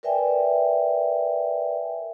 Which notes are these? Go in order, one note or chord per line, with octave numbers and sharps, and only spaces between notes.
A#4 B4 D5 E5 G5 G#5